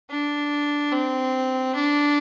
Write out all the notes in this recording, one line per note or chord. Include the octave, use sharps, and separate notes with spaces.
D4
C4
D4